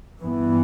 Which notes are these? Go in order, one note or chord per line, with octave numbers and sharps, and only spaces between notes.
G2 E3 B3